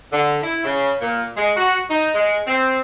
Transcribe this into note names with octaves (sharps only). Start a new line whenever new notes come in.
D3
E4
C#3
A#2
G#3
F#4
D#4
G#3
C4